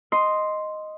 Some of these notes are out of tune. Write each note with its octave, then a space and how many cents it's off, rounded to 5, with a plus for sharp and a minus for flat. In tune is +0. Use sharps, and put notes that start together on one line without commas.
D#5 +0 C6 +0